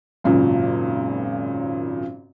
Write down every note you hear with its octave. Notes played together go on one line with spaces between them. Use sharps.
G#1 F#2 A#2 C#3